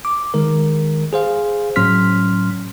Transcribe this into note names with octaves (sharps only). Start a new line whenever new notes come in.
D6
D#3 G#3 A#4
G#4 C5 F5
A2 F#3 C#4 C6 F6 B6